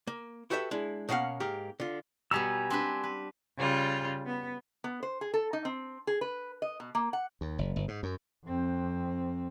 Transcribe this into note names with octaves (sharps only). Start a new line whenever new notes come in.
A#3
E4 F#4 G4 A4 B4 E5
G#3 D4 E4
B2 A#3 C#4 F5 F#5
G#2 A#3 G4 A#4
D3 F4
B2 G3 B3 G#5 A#5 E6
C4 D4 B4
B4
C#3 G3 F4
B3
B3
C5
G#4
A4
D#4
C4
G#4
B4
D#5
B2
A#3
F#5
D#2
F#1
G1
G#2
F#2
F2 C4